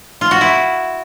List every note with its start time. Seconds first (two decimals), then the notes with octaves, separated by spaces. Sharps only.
0.21 F4
0.31 F#4
0.41 E4